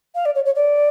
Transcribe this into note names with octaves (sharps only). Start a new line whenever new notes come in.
F5
D5
C#5
C#5
D5